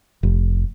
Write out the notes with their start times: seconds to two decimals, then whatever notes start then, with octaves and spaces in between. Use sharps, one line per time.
0.23 F1